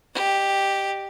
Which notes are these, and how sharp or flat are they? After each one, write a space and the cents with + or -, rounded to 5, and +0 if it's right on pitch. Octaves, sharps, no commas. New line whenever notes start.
G4 +0 D#5 -30